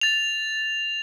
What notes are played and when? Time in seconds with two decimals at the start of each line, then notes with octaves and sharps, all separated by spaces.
0.01 A6 F7